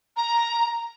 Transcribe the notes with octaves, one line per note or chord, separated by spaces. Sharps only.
A#5